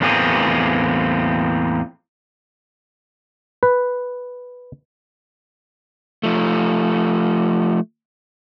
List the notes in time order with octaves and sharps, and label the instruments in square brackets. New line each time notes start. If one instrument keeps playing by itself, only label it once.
[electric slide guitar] E2 A2 A#3 C4 G#4
[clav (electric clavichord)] B4
[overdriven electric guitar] F3 A3